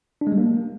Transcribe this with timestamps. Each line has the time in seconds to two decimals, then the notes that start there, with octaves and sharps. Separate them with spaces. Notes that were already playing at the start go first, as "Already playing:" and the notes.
0.21 D4
0.27 G#3
0.32 G3
0.38 A#3